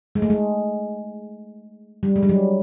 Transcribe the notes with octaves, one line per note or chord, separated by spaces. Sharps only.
G#3
A3
G#3
G3
G#3
G3
F#3